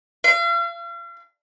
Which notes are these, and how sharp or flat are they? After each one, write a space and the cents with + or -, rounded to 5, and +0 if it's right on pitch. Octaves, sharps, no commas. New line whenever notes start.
F5 -40